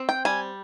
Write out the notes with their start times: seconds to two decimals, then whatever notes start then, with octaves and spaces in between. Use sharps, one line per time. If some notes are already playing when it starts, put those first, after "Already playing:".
Already playing: C4
0.09 G5
0.25 G3 G#5